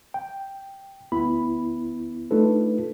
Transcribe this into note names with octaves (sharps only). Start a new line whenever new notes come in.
G5
D2 B3 E4 B5
A3 D4 D#4 F4 A4 B4